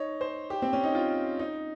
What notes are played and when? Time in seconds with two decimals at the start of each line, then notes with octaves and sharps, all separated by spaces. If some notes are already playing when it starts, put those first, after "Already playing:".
Already playing: D#4 C#5
0.21 C5
0.50 G4
0.62 C4
0.73 C#4
0.84 D#4
0.95 F4
1.39 D#4